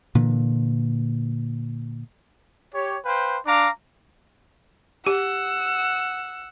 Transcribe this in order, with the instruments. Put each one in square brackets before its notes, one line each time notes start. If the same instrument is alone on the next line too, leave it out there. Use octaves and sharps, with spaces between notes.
[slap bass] A#2 D3 E3
[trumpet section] G4 C#5
B4 C5 F5 G5
D4 F5 A#5 D6
[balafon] G4 [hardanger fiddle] F#5 [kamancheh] E6